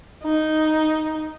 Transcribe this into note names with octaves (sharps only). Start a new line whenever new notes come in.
D#4